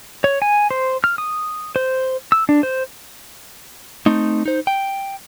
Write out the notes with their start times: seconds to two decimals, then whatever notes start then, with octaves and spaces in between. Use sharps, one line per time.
0.24 C#5
0.42 G#5
0.71 C5
1.04 F6
1.18 D#6
1.76 C5
2.32 E6
2.49 D4
2.63 C5
4.06 A3 C4 D#4
4.46 D#4 C5
4.67 G5